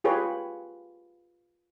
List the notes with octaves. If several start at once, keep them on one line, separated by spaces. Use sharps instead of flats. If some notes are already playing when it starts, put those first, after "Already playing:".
F4 G4 G#4 B4 C#5